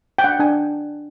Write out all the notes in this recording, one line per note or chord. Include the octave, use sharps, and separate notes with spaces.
G5
D4 F#5
D4 G#5